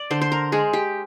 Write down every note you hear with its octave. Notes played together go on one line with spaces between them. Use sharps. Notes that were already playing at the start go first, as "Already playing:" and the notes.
Already playing: D5
D3 C5
C5
A#4
G#3 G#4
G4